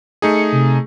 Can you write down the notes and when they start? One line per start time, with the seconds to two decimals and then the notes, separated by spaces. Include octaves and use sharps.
0.22 A3 D#4 G#4 C#7
0.52 C3